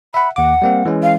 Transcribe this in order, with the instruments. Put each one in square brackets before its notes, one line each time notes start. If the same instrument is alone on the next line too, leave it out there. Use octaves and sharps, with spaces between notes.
[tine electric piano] E5 F#5 [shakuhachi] B5
[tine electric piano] D#2 D6 [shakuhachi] F#5
[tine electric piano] G3 A#3 C4
E3 G#3 C#4
[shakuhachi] F5